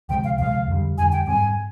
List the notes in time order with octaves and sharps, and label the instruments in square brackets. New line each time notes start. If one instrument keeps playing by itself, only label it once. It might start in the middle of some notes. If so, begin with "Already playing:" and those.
[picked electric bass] D2 C3 F3 G#3 [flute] G5
[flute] F5
[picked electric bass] D2 C3 F3 G#3 [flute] F5
[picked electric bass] F2 D3 G3
[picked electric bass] F2 D3 G3 [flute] G#5
[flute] G5
[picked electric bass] G#2 G3 C4 [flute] G#5